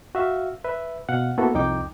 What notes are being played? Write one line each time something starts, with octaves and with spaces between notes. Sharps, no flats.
F#4 E5 F5
B4 E5
B2 F5 F#5
A#3 B3 E4 F#4 A4
C2 F2 D#4 G5 D6